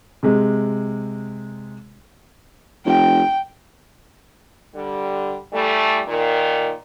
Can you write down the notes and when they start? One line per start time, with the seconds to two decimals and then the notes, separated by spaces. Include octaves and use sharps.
0.23 C3 G#3
2.86 F1 G5
4.74 D3 G3
5.53 E3 G3 A3
6.07 A#2 D#3